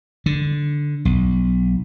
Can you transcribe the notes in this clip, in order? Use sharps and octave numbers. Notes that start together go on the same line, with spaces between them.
D3
B1